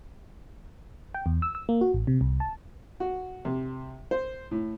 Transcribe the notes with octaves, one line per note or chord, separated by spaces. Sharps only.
G5
E2
E6
E6
A#3
F#4
A1
C3
C2
A5
F#4
C3
C5
A2